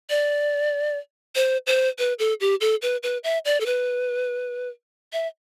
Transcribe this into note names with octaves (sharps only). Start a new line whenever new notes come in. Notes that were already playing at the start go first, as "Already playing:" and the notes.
D5
C5
C5
B4
A4
G4
A4
B4
B4
E5
D5
A4
B4
E5